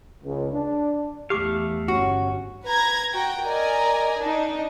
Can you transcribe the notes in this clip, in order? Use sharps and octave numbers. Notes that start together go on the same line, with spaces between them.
C#2
D4
E2 A3 G4 F5 D6
G1 C#4 F#4
B4 A#5 G#6
F#4 G5 A#5
A#4 D5 D#5 G#5 A#5
D4 D#4